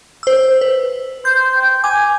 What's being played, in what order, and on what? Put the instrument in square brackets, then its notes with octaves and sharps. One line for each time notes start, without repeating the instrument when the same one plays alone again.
[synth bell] C5 E6
B4
[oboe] C5 [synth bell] G6
[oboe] G5
[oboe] G#5 [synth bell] D6